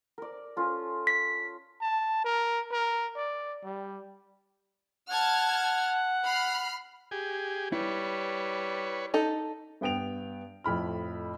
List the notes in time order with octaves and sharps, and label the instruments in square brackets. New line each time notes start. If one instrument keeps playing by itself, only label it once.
[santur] A#4 D5
C#4 F4 A4
[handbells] B6
[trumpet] A5
A#4
A#4
D5
G3
[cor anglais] F#5 [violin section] A5 F6 G#6
[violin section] B5 F6 C7
[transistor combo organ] G4 G#4
[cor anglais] G3 [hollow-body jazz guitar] E4 [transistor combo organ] B4 C#5
[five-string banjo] D#4 A4
[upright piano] G2 B3 G5 D7 F7
F2 A2 B5 F6